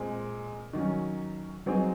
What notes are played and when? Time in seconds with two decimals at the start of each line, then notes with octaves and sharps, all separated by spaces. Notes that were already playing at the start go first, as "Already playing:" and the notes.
Already playing: A#2 G#3 C4
0.73 D#3 F#3 C#4
1.66 F#3 C4 D#4 G#4